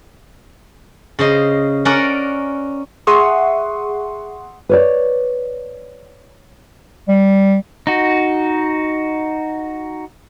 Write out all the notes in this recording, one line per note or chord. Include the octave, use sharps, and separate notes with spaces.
C#3 C5 D#5
C#4 A#4 D5 F#5
G#4 E5 F#5 C6 C#6 D#6
B4 C#5 D5
G3
D#4 F#4